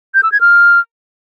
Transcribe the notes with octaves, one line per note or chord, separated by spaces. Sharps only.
G6
E6
G#6
F6